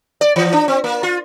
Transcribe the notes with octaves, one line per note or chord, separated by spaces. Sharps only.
D5
E3
D4
C4
A#3
F4